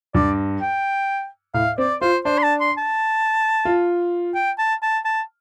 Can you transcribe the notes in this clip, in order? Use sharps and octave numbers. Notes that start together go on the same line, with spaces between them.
G2 D5
G5
A2 F5
C4 D5
F4 C5
D4 C5
C6
A5
C6
A5
F4
G5
A5
A5
A5